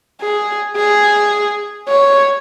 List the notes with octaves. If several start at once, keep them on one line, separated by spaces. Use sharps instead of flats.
G#4
G#4
C#5